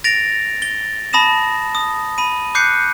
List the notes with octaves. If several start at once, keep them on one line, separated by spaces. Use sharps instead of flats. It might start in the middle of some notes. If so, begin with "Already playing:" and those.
A6 A#6 D7 F7
A6 G7
A5 B5 D#6 A#6 E7
D#6
B5 D#7
D6 F#6 G6 C7 C#7